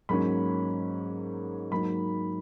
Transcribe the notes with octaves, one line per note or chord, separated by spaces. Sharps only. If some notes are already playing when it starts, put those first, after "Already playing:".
G#2 F#3 A#3 C#4 B5
G#2 F#3 A#3 D#4 B5